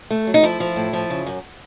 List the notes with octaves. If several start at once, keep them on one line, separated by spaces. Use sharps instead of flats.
A3
F#3
D#4
F3 E4
F3
A2
F3
C#3
F#2